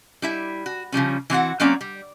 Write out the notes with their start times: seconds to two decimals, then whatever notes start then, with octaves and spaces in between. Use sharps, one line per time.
0.22 G3 E4 E5
0.66 F#4
0.92 C#3 F3 G3 C#4
1.30 E3 C4 F#4 F#5
1.60 F#3 A#3 C4 C#4 C#5 D5
1.81 G3